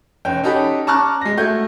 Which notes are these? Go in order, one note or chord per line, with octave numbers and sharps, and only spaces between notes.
F1 C#4 G5
C#4 D#4 G4 A4 F#5 B5
A5 A#5 C#6 D6 F6 F#6
G#3 A#6
A3 F#4 G6 G#6